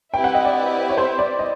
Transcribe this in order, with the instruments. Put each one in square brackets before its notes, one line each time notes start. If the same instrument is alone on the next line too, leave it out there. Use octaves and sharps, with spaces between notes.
[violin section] C4 E4 G4 B4 E5 [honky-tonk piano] G5
[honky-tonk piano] F#5
D#5
D5
C#5
C5
D5
D#5